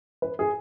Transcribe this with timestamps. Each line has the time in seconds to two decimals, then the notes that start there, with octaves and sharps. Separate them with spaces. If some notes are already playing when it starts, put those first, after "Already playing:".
0.22 B4
0.39 G#4